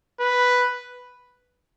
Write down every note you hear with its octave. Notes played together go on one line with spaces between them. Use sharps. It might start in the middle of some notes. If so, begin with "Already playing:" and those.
B4